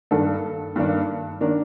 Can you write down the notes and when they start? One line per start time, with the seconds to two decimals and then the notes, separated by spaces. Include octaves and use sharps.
0.11 G2 D#3 A#3 D4 A4
0.76 G2 D#3 A#3 D4
1.41 D#3 A#3 D4 A#4